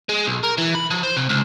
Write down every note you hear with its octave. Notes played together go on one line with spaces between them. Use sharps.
G#3
B1
A#4
E3
B5
F3
C5
C3
C#2